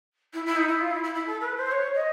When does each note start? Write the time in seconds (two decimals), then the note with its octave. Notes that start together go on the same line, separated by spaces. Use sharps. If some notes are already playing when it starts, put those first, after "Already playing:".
0.33 E4
0.46 E4
0.56 D#4
0.68 E4
0.80 F4
0.91 E4
1.03 E4
1.14 E4
1.26 A4
1.41 B4
1.57 C5
1.71 C#5
1.95 D#5